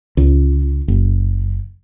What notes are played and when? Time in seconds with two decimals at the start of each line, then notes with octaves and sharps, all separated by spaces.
0.17 C#2
0.88 F#1